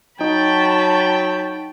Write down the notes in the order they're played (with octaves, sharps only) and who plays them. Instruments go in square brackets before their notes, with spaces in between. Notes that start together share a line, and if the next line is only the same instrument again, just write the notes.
[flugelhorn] F#3 [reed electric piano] D#4 [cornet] G5 [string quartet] A5 B5 C#6